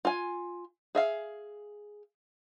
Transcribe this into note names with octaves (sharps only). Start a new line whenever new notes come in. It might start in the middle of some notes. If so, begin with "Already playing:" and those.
F4 G#5
G#4 E5 F5